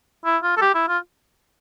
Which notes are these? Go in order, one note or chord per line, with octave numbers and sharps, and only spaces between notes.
E4
F4
A4
G4
E4
F4